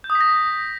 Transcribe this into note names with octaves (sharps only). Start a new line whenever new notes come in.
G6
D#6
B6
A#6